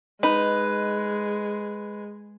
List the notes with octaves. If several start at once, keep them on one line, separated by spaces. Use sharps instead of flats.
G#3 D#4 B4